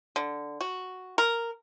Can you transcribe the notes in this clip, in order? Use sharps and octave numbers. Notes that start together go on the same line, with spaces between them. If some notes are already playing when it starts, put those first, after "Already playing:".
D3
F#4
A#4